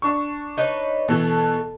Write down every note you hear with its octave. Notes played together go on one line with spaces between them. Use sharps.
D4 C#6
D#4 B4 C#5
B2 E3 A4